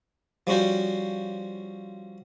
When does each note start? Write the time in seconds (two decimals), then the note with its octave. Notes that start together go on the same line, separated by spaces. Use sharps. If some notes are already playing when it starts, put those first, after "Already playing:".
0.47 F3 G3 C#4 F#4 C5